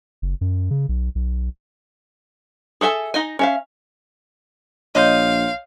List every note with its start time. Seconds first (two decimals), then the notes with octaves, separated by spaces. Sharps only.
0.22 F#1
0.41 F#2
0.71 C#3
0.89 B1
1.15 B1
2.81 G#4 A4 E5 G#5
3.14 D#4 D#5 G#5
3.39 C#4 E5 F5
4.95 A#1 C#5 D#5 F5 C6 G6